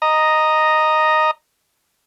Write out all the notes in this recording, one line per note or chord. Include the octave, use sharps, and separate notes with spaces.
D#5 A#5